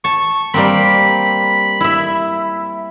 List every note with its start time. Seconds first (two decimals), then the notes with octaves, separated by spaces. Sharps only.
0.04 A5 C#6
0.54 G3 A#3 C4 B5
1.81 E4 E5